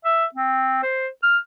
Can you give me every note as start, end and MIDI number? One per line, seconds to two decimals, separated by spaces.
0.05 0.25 76
0.34 0.81 60
0.83 1.07 72
1.23 1.37 89